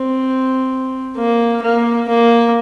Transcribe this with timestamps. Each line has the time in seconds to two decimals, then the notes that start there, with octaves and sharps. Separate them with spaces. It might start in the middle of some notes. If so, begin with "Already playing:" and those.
Already playing: C4
1.17 A#3
1.62 A#3
2.09 A#3